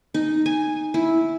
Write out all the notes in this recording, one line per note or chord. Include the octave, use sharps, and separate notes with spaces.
D#4
G#5
E4